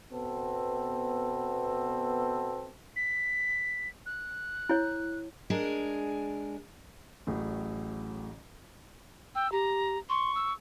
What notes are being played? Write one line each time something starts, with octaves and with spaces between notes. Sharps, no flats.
B2 B3 C4 A4
B6
F#6
E4 C#5
G#3 D4 G#4 A#4
A1 A2 F#3 G#4
G5 E6
G4 A#5
C6 C#6
E6